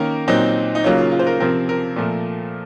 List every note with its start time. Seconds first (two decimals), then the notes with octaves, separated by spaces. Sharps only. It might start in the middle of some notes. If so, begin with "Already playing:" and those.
Already playing: D#3 A#3 C#4 A#4
0.28 A#2 F#3 C4 D#4
0.75 D#4
0.84 C#3 F#3 A#3 C#4 F4
0.98 F4
1.12 F4
1.19 C5
1.27 A#4
1.40 C3 F3 C4 A#4
1.69 A#4
1.96 A#2 F3 A3